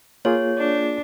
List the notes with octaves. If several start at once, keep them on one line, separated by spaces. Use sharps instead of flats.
A#3 F4 G#4 C#5
D4